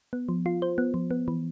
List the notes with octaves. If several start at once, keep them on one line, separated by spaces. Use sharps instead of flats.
B3
F3
F4
C5
B3
F3
B3
E3